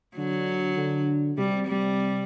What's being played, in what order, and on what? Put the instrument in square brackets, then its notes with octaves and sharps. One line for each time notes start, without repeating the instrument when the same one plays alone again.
[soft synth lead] D3 [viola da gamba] F#3
[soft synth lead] D3
[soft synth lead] C3 [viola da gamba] G3
[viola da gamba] G3